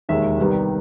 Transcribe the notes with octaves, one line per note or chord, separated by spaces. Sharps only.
E1 D#2 D#3 G#3 E5
C2 C3 D#3 G3 B3